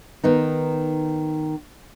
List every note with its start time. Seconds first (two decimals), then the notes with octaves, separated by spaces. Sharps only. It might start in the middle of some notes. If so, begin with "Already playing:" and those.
0.24 D#3 B3 D#4